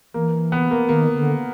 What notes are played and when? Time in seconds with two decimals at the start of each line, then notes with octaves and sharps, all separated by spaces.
0.14 E3 A#3
0.52 B3
0.71 A#3
0.89 D#3 A#3
1.15 D3